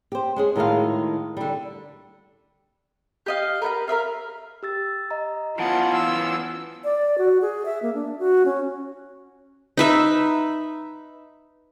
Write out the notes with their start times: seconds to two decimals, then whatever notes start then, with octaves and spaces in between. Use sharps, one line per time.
0.12 G4 C5
0.36 G#3 C#4 G#4
0.55 A2 D#3 G#3 F4 F#4 F5
1.37 D3 G3
3.26 G4 D#5 F5
3.62 A#4 B4 F#5 A#5
3.87 A#4 B4 E5 F5
4.63 G4 E6 A6
5.11 D#5 A#5
5.59 E3 B3 C#4 F4 F#5 A5
5.94 F#5 E6
6.84 D5
7.18 F#4
7.42 G#4
7.65 E5
7.82 A#3
7.94 D4
8.19 F#4
8.46 C#4
9.77 D#4 B4 E5